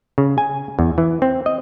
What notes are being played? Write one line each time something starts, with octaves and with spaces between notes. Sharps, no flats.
C#3
G#5
E2
E3
C4
D#5